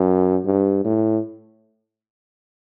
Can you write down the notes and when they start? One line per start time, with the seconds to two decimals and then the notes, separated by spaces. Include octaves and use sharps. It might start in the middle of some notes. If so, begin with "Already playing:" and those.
Already playing: F#2
0.46 G2
0.85 A2